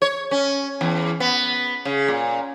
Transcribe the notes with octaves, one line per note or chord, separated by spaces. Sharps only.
C#5
C#4
E2
B3
C#3
A#2